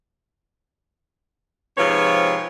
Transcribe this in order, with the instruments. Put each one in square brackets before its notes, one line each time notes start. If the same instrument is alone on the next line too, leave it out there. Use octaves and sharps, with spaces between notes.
[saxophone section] G#2 C3 F3 C4 B4 C#5